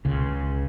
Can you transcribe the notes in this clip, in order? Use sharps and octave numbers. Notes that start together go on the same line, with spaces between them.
C#2 C#3